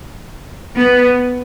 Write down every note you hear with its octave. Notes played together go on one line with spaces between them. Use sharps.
B3